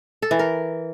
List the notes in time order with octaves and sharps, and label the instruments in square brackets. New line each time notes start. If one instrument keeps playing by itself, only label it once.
[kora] A4
E3
A#4